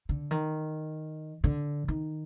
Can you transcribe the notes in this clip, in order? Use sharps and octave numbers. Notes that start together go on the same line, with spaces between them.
D3
D#3
D3
D#3